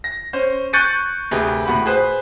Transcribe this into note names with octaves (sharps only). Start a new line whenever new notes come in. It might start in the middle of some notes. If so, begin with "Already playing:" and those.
A#6
C#4 C5
C#6 F#6 G6 A6 C#7 D#7
D2 C3 G#4 B4 G5
A2 F#4 B5
G#4 B4 C5